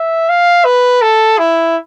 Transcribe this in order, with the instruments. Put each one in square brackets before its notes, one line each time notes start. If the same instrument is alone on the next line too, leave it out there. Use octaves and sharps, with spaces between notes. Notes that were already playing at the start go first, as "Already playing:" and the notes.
Already playing: [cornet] E5
F5
B4
A4
E4